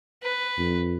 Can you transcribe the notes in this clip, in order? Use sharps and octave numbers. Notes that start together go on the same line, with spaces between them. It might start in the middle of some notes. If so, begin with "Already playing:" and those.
B4
F2